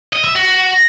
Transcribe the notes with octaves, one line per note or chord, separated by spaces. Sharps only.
D#5
E5
F#4